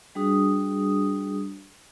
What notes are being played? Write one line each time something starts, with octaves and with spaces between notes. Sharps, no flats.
G3 D4 F#4 G#4 D#6